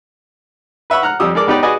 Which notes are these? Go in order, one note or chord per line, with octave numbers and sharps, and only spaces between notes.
B4 E5 F#5 B5 C#6
F#5 A#5 F6 F#6
F2 F3 G3 G4 D#6 E6
G#3 A4 A#4 D5 D6
B3 D#4 G4 B4 D5 G5
F#4 G#4 B4 D5 D#5 G#5